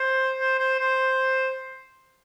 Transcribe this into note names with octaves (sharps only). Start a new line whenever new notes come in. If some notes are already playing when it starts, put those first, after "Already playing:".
Already playing: C5
C5
C5
C5